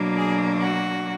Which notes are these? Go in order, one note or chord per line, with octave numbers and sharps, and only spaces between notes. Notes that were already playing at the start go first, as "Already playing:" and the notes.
Already playing: B2 F#3 A#3 D4
G#4
F#4